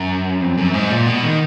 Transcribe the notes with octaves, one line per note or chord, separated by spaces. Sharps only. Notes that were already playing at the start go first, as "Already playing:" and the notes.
Already playing: F#2
F2
F#2
G#2
A#2
B2
D#3